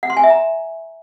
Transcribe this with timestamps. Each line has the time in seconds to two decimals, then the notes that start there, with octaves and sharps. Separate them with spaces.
0.03 F#5
0.10 C6
0.17 G#5
0.23 E5
0.30 A#5